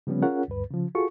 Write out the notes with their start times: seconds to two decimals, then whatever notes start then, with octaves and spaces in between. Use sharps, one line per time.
0.07 C#3 F3 G3 B3 C#4
0.23 C#4 F4 G#4 A#4 C#5 F#5
0.48 D2 G2 B4
0.71 C#3 F3
0.95 F4 F#4 G#4 A4 C#6